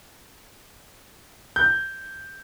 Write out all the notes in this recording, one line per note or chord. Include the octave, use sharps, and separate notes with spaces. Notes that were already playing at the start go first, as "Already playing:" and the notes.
G6